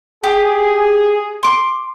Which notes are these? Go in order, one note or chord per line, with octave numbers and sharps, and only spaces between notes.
G4 G#4
C6 D6